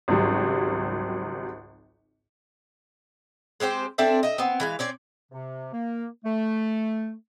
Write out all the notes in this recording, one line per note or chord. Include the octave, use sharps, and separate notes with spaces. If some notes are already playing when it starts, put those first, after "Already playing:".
G#1 C#2 F#3 G3
G#3 C4 G4 C5
C4 D4 A4 E5
D#5 E5
B3 C4
E3 G#3 F5
C4 C#4 D5
C3
A#3
A3